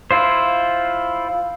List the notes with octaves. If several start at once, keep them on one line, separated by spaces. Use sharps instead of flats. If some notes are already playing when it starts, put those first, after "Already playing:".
E4 F4 C5